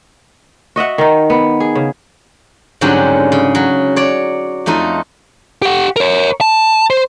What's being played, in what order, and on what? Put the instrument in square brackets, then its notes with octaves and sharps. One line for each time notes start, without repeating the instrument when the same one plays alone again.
[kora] F#4 D#5 E5 F#5
D#3 D#4
B3
G#4
C#3
[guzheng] G#2 D3 F#3 G3 C4 C#4
C#3
F#3
C#5 D5
F2 A3 D#4 F4
[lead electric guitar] G4 F#5
A#4 C#5
A5
C5